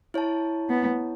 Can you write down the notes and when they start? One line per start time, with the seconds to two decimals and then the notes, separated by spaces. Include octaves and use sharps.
0.14 E4 C#5 A5
0.69 B3